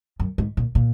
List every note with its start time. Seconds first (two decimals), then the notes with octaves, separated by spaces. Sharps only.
0.20 F#2
0.38 G#2
0.57 A#2
0.75 A#2